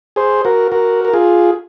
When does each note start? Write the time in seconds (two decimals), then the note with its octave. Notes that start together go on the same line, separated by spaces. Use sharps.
0.16 G#4 C5
0.45 F#4 A#4
0.72 F#4 A#4
1.05 A#4
1.13 F4 G#4